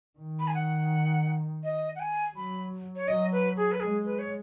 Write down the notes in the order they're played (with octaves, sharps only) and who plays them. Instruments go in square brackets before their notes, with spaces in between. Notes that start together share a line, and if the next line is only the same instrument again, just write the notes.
[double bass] D#3
[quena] B5
G#5
F#5
D#5
F#5
G#5
[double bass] F#3 [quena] B5
[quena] C#5
[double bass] F#3 [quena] D#5
[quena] B4
G#4
B4
[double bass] G#3 [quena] G#4
[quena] B4
C#5